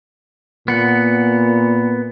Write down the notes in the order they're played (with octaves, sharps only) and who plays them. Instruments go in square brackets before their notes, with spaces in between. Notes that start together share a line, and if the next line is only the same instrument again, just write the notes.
[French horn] A#2 [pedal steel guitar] B3 F#5